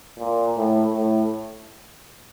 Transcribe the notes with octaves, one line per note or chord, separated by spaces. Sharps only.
A#2
A2
A2